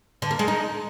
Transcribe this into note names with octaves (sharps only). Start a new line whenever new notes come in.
D3
A#3
G#3
D#4